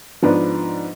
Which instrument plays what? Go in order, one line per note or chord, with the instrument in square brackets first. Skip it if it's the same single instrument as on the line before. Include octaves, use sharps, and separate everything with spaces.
[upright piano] G#2 F3 B3 D4